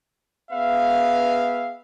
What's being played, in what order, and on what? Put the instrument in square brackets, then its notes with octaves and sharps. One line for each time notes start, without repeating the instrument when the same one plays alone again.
[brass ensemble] B3 G#4 B4 E5 F5